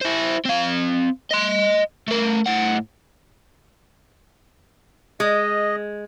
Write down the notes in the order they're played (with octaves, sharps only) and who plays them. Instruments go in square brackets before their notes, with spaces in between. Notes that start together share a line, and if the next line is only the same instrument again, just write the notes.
[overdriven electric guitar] E4 C5
C4 F5
D#5 C6
A3 A#4
A2 F#5
[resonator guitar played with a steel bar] G#3 [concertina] D#5